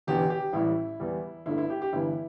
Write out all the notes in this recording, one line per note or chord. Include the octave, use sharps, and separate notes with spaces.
E1 E2 D3 G4
G4
A1 A2 G3 E4
E2 E3 G3
G1 G2 D3 A3 E4
E4
G4
G4
G1 G2 E3 E4